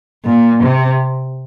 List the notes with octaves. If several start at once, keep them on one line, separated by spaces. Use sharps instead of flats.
A#2
C3